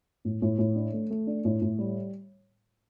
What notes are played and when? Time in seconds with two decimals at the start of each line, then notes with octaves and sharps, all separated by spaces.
0.25 A2
0.42 A2
0.58 A2
0.76 D4
0.93 A3
1.10 A3
1.27 D4
1.45 A2
1.61 A2
1.79 G3